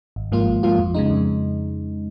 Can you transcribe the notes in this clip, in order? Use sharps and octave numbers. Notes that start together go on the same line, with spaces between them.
G#1
G#2 F3 A#3 F4
G#1
G#2 F3 A#3 F4
F2
C#3 G#3 D#4
F2